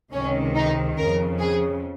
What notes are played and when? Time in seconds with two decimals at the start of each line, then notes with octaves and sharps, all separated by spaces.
0.12 C#2 C3 D#3 C#4
0.55 D#4
0.97 F2 C#3 A#4
1.39 G#4